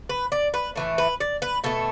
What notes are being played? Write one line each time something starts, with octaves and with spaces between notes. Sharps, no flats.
B4
D5
B4
A2 E3 A3
B4
D5
B4
B2 A3 A4